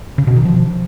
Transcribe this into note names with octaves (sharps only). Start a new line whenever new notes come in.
C#3
B2
D#3
F3